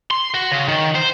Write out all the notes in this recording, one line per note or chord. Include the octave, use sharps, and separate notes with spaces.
C6
F#4
C#3
D#3
C5